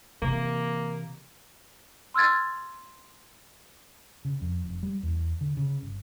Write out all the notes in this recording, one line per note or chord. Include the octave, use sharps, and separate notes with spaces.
C3 E3 A#3
C6 E6 F6 G#6 A6
C#3
F2
F1
G3
E2
D3
C#3
G1